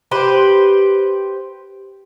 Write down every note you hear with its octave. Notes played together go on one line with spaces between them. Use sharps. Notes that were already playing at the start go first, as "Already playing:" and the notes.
G4 B4 C5